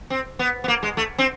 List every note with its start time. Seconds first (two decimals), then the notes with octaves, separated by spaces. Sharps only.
0.10 C4
0.39 B3
0.64 B3
0.68 A#3
0.83 G#3
0.97 A3
1.18 C4